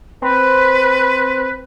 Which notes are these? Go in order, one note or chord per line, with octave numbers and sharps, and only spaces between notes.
C4 B4